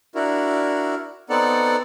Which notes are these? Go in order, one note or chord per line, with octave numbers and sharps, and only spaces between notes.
D4 E4 F#4 A#4
B3 C4 D#4 A4 D5 F#5